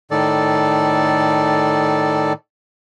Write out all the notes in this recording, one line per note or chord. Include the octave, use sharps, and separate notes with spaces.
A2 D#3 A4 D5